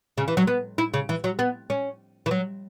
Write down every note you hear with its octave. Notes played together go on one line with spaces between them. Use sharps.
C#3
E3
F#3
B3
E4
C#3
E3
F#3
B3
C#4
E3
F#3